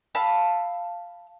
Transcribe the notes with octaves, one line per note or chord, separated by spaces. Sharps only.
F5 A5 B5 E6